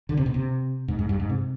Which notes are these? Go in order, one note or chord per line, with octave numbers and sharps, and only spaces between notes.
D3
C3
B2
C3
G#2
G#2
G2
G#2
C3